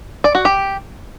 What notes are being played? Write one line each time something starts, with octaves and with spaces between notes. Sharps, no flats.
D5
F#4
G4